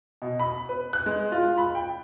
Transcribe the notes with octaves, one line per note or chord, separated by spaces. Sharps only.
B2
B5
B4
F#6
G#3
F4
B5
G5